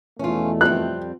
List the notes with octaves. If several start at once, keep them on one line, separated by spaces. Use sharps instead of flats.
E2 B2 A3 C#4 F4
F2 G3 C4 F#6